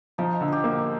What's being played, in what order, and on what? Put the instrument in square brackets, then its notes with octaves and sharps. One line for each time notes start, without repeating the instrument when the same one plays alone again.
[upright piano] F3 [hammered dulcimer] D#4
[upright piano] D3
[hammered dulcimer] G4 G#4
[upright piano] A#3